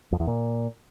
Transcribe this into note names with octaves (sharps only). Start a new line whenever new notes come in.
F2
E2
A#2